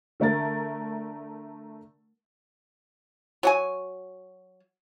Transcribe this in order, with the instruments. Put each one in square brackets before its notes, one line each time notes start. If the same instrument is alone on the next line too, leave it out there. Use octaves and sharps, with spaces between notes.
[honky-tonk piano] D3 A3 A#4 A6
[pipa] F#3 F#4 G#5